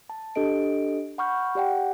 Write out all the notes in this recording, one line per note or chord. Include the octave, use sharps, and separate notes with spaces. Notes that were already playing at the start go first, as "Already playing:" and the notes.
A5
D4 G4 A4 D#5 D7
F#5 B5 C#6 F6 G6
G4 D5 F#5 G5